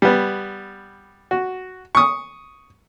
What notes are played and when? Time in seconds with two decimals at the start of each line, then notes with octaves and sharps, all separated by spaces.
0.02 G3 B3
1.31 F#4
1.95 C#6 D#6